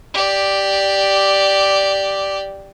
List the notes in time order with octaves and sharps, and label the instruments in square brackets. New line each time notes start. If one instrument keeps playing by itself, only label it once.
[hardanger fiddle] G4 D5